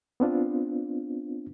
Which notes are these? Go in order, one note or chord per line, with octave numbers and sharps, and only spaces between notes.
B3 C4 D4 F4